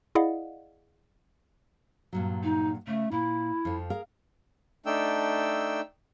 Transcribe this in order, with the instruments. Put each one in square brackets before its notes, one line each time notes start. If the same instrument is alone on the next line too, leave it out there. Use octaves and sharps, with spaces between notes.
[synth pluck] E4 G#4 D5 D#5 F5 F#5
[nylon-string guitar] G2 A#2 F#3
[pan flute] D#4
[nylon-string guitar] C#3 [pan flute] A3
[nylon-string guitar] A#2 [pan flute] E4
[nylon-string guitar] F2 F3
G#4 A#4 F5
[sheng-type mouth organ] A3 D4 D#4 G5 E6